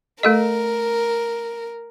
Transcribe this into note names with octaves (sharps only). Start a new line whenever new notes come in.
A3 A4 A#4 D#5